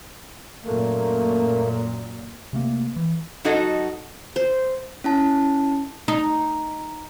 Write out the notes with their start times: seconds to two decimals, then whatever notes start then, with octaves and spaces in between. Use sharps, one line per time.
0.64 F#2 A#2 A3 A#3
2.53 C3 A3 A#3
2.96 E3
3.44 F#3 D#4 F#4 A4 D#5
4.36 C5
5.04 C#4 E4 A5
6.08 D#4